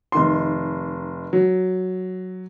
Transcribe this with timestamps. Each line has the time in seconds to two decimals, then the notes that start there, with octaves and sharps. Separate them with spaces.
0.12 F1 D#3 C6
1.33 F#3